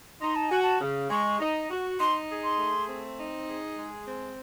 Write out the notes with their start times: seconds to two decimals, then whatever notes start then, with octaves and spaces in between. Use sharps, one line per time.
0.21 D#4 C6
0.35 A5
0.49 F#4 G#5
0.63 A5
0.81 C#3
1.10 G#3 C#6
1.40 D#4
1.70 F#4
2.00 D#4 C6
2.29 G#4
2.44 C6
2.59 A3
2.88 C4
3.18 D#4
3.47 G#4
3.78 G#3
4.07 C4